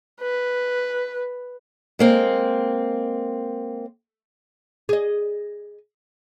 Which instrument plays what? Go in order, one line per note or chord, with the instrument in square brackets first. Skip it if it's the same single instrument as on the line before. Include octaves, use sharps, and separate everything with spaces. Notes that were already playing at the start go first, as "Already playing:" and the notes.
[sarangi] B4
[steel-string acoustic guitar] G#3 A#3 C4
[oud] G#4 D#5